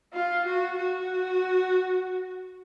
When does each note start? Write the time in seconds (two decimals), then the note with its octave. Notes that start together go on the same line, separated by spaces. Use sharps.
0.14 F4
0.46 F#4
0.78 F#4